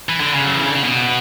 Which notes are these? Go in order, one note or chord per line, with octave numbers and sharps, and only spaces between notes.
E3
D3
C#3
F#3
E3
D3
C#3
B2